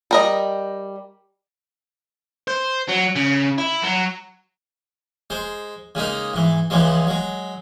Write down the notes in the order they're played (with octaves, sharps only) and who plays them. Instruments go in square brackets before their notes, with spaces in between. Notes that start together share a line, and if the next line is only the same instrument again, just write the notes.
[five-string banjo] G3 A#4 D#5
[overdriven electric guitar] C5
F#3
C#3
E4
F#3
[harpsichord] G#3 C5
C#3 G#3 A#3 D#4
G#2 E3
C#2 C#3 E3 F3 G#3
F#3 G#3